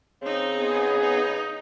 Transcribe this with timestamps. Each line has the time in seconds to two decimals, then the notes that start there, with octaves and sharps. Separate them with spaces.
0.22 C#3 C4 D#4
0.52 B3 G#4
1.01 D#4